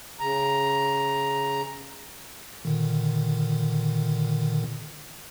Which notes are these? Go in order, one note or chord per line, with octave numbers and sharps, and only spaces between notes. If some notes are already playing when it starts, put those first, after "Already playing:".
C#3 A#5
A#2 D3 D#3